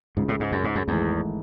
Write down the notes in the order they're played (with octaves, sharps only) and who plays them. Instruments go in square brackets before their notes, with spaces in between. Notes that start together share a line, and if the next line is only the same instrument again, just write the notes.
[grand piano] C#2 C#3 G#3 [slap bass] G#2
[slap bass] A2
G#2
F#2
G#2
F#2
[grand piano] G#1 G#2 E3 A3 [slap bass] E2